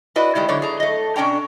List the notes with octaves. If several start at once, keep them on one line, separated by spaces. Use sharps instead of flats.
E4 F#4 B4 D5 D#5
D#3 G3 G#3 E4
G#2 D3 F#3 C#5 D5
G#4 A#5
A3 D#5
B2 C#4 D4 G5 A#5